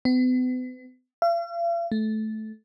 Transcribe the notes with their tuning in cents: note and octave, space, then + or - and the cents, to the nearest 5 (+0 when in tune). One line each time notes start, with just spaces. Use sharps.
B3 +40
F5 -45
A3 -15